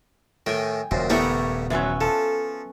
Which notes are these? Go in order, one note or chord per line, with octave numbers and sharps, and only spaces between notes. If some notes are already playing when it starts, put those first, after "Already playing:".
A2 D#3 G5 G#5
D#1 F#2 A#2 C#3 C5
G3 A3 B3 D#4 E4 A#4 C#5 D5
E2 G#2 F#3 C#4 B4 E5
F3 A4